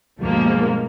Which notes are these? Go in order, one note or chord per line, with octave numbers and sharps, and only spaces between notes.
D2 G2 B2 F3 G#3 A#3